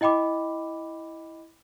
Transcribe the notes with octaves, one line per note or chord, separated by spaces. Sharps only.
E4 D#5 G5 B5 D6